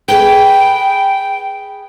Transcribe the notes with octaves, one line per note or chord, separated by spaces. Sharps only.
G#4 B4 G5